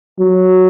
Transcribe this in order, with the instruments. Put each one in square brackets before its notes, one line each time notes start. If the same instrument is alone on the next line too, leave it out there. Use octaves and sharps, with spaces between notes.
[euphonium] F#3